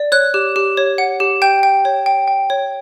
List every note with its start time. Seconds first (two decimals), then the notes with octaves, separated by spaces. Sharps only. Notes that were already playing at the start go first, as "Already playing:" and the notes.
Already playing: D5
0.12 C#5 F#6
0.34 G4
0.56 G4
0.77 C#5
0.98 F#5
1.20 G4
1.42 G5 G6
1.63 G5
1.85 C#5
2.06 G5
2.28 G5
2.50 C#5